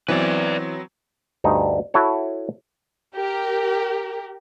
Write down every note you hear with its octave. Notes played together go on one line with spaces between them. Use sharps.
E3 F#3 B3 C4 B4 D5
D2 G2 D#4
E4 F#4 A4 C#5
G4 A#4